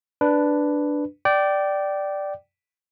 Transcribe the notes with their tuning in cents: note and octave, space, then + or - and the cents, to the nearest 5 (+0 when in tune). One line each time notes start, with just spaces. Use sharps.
D4 +0 B4 +0
D5 +0 G5 -20